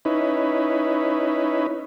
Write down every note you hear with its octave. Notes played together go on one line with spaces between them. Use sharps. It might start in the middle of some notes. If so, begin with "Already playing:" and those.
C#4 D#4 E4 B4